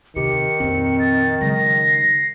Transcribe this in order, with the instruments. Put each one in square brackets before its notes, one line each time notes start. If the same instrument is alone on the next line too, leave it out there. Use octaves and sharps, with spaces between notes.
[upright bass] D#2 C3 [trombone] D#3 [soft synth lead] G4 [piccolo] C#7
[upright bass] F2 A#2 [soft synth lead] C4
[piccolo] A6
[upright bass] C#3 G#3 [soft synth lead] F#3 [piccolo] A#6
[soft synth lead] C7